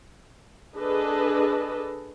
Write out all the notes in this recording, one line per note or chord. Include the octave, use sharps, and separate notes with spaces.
D4 G#4 A4 B4 D#5